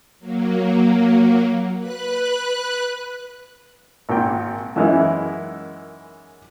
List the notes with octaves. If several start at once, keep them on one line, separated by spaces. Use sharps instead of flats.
F#3 A#3
B4 F#6
G#1 A#2 G5
F#2 E3 G#3 A#3 D#4 E4